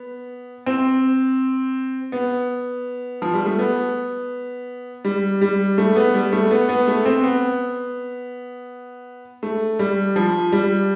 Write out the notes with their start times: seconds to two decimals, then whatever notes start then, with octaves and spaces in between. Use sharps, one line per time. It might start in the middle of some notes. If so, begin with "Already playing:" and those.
Already playing: B3
0.66 C4
2.12 B3
3.22 F3
3.34 G3
3.46 A3
3.59 B3
5.05 G3
5.41 G3
5.78 A3
5.96 B3
6.14 G3
6.33 A3
6.51 B3
6.69 B3
6.88 A3
7.05 C4
7.23 B3
9.43 A3
9.79 G3
10.16 F3
10.52 G3